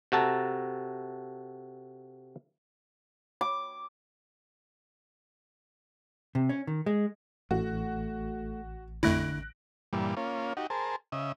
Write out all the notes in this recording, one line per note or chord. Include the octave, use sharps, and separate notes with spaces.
C3 F#4 A4 A5 A#5
D6
C3
C#4
D#3
G#3
A1 A3 F#4
F2 D3 A3 E4 F#6 A#6 D7
G2 A#2 E3 G3
A#3 C#4 F4
D#4 F#4 G4
G#4 A#4 C5 A5
C#3 D#5 E5